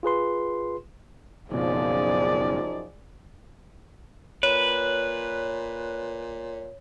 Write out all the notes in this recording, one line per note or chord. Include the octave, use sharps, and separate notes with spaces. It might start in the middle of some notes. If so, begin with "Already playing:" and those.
F4 G#4 B4 C6
F#1 F#2 B2 F3 D#4 G#4 D5
A#2 B4 C#5